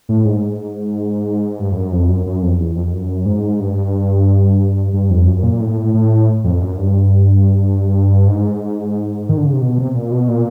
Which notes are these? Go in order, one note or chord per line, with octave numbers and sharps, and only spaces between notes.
A2
G#2
G2
F2
F#2
F2
F#2
F#2
F2
E2
F2
F#2
G#2
G2
G2
F2
F#2
A#2
A2
A2
F2
F#2
G2
G#2
D#3
D3
C#3
C3
B2
C3
A#2
B2
A#2